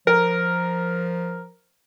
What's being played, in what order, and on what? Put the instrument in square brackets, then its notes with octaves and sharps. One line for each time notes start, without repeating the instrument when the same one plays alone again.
[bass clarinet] F3 [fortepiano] A#4